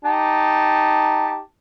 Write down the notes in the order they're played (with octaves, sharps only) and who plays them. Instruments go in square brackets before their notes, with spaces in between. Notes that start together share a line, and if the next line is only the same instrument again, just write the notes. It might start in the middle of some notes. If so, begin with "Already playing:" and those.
[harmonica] D#4 G4 A5